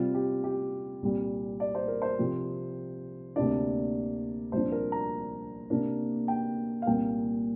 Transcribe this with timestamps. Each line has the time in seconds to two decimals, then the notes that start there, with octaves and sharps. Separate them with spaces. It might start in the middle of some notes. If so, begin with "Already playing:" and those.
Already playing: C3 G3 C4 F4
0.15 G4
0.44 G4
1.02 C2 A#2 G3
1.60 D5
1.75 C5
1.88 A#4
2.02 C5
2.19 C3 F3 C4
3.36 D2 C3 A#3 D4 D5
4.52 C2 A#2 F3 D4 C5
4.72 A#4
4.92 A#5
5.70 C3 A#3 D4
6.28 G5
6.82 F5
6.87 C2 A#2 A#3 G5